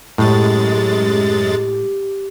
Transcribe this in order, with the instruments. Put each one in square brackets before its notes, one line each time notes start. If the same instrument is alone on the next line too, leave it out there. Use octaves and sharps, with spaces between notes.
[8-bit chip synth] F#2 G#3 A6 [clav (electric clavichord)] A2 [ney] G4